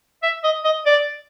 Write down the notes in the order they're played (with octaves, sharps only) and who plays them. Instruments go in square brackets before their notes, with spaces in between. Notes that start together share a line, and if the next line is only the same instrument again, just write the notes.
[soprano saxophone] E5
D#5
D#5
D5